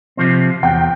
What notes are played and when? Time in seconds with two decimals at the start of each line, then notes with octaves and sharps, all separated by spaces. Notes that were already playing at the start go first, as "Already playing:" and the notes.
0.17 C3 F3 C4
0.63 E2 G5